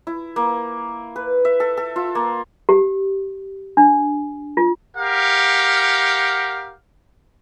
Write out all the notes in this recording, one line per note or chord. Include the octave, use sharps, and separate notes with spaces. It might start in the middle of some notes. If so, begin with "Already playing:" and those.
E4
A#3
B4
E5
A4
A4
F4
A#3
G4
D4
F4
G4 A#4 F5 F#5